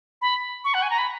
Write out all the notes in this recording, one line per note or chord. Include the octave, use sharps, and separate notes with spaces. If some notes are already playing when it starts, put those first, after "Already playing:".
B5
C#6
F#5
G#5
A#5
B5